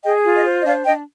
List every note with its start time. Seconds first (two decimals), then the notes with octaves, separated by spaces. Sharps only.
0.03 G#4 D#5 G5
0.23 F4
0.34 D#5
0.45 C5
0.60 D#5
0.65 D4 D5 F5
0.85 D4 D#5 G5